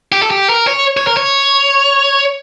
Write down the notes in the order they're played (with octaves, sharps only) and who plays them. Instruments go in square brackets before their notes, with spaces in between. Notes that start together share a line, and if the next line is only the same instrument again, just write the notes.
[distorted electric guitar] G4
A4
G4
A#4
C#5
C#5
A#4
C#5